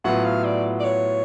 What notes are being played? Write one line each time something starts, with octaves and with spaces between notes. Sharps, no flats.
A2 F#3 B3 F4 F#5
F5
D5
D5
C#5